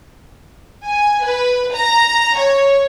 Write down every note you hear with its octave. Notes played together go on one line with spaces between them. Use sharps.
G#5
B4
A#5
C#5